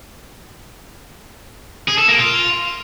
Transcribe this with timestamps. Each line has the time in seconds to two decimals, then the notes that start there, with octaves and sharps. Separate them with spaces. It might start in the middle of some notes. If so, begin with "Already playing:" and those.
1.88 G#4
1.98 A4
2.08 A#3
2.18 F4